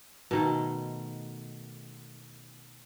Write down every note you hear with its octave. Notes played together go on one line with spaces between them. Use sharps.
B2 D#3 A3